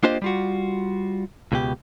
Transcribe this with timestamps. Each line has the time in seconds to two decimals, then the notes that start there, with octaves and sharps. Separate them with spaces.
0.03 A#3 D4 F4 G4 C5 D#5
0.22 G3 F4 F#4
1.52 C#2 B2 G4